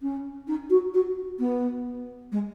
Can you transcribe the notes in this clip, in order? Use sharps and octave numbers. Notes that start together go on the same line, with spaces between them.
C#4
D#4
F#4
F#4
B3
G#3